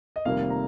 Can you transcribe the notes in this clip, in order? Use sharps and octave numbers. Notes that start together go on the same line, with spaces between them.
D#5
F1 F2 D#3 G3 A#3 F5
A#5